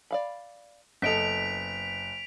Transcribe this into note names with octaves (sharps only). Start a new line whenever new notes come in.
D5 F5 B5
F#1 B3 A4 D#5 B6 D7 F7